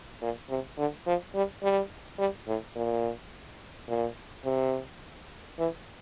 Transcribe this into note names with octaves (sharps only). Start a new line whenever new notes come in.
A#2
C3
D3
F3
G3
G3
G3
A2
A#2
A#2
C3
E3